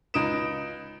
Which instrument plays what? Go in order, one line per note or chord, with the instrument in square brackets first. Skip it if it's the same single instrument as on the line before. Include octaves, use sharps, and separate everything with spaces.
[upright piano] C#2 D#4 D#6 D7 E7